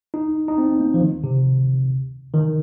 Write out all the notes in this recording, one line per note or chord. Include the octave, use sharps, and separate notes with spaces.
D#4
D#4
C4
A#3
F3
D#3
C3
D#3